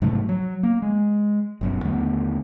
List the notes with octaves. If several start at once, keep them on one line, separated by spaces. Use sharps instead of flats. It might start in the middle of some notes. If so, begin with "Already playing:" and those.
G#2 C3 F#3 A3
F#3
A#3
G#3
G1 F#2 B2
D#2 D3 A3 B3